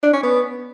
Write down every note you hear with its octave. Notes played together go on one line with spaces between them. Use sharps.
D4
C#4
B3